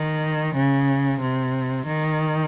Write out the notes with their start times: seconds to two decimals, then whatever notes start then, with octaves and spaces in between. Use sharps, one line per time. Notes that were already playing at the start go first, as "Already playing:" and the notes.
Already playing: D#3
0.55 C#3
1.20 C3
1.86 D#3